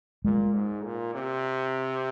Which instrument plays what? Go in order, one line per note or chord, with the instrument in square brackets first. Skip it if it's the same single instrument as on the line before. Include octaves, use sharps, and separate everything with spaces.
[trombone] A#2 [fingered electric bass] G#3
[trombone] G#2
A#2
C3